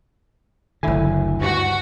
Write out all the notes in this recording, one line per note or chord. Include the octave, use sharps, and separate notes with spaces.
F#1 D2 D3 E4 G#5
G2 F#4